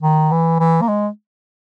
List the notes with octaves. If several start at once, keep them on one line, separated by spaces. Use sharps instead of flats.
D#3
E3
E3
A#3
G#3